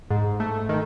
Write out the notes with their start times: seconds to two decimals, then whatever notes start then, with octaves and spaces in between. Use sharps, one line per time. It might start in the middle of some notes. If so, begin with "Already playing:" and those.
0.10 G#2
0.40 A3
0.69 D#3